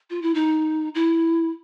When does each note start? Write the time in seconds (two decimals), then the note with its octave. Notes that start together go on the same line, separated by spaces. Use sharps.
0.10 F4
0.22 E4
0.34 D#4
0.95 E4